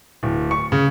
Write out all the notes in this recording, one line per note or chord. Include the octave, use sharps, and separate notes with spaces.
D1
C#6
C#3